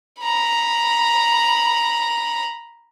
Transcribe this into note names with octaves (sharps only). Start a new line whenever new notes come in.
A#5 B5